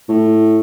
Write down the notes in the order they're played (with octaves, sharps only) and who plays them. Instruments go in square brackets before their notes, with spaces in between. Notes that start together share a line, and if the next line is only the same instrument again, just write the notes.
[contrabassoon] A2